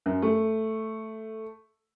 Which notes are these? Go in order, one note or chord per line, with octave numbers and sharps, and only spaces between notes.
F#2
A3